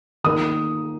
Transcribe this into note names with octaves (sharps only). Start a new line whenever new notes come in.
D#3 A#3 D#4 A#4 D#6